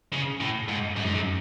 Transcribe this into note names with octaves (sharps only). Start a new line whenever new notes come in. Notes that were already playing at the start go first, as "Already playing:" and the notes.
C#3
A2
G#2
F#2
G#2
F#2